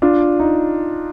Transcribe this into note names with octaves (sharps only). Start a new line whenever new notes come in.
D4 F4
D#4